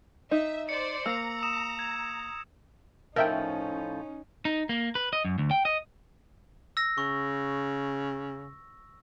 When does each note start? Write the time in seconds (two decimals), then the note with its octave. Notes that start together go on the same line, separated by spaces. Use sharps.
0.31 D#4 E5
0.69 C5 D5 C#7
1.06 A#3 A#5 E6
1.43 D#6 E7
1.79 G#6
3.16 A2 F3 C#4 D#4 A#4 E5 G5
4.45 D#4
4.69 A#3
4.95 B4
5.13 D#5
5.25 F#2
5.38 D2
5.51 G5
5.65 D#5
6.77 E6 A#6
6.98 C#3 C#6